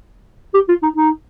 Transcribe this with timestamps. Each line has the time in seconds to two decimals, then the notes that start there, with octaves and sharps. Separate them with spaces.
0.54 G4
0.68 F4
0.83 D#4
0.96 D#4